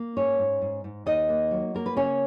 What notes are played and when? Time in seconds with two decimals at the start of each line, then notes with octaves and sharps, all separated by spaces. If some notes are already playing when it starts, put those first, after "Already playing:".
Already playing: A#3
0.16 G#2 C#4 C#5
0.39 G#2
0.62 G#2
0.84 G#2
1.06 D#2 D#4 D#5
1.29 A#3
1.51 F#3
1.74 A#3 A#4
1.86 B4
1.96 C#3 C#4 C#5